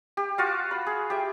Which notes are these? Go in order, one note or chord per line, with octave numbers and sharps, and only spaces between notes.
G4
F4 F#4 F5
B5
G#4
G4 E5